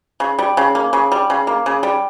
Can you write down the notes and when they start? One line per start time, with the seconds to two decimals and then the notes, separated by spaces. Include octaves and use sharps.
0.20 C#3
0.39 G3
0.57 C#3
0.75 A#3
0.93 C#3
1.12 G3
1.30 C#3
1.47 A#3
1.66 C#3
1.83 G3